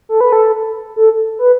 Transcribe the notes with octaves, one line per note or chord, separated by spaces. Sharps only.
A4
B4
A4
A4
B4